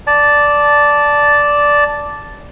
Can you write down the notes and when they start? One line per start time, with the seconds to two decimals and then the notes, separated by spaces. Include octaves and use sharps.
0.07 D5 A5